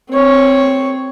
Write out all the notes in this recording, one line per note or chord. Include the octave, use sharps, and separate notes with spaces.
C4 C#5